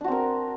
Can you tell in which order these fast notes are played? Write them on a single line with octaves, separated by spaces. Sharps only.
D4 F#4 C4 A#4